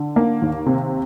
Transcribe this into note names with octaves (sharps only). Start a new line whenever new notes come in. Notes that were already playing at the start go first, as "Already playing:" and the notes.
Already playing: D3
A#3
D#2
C3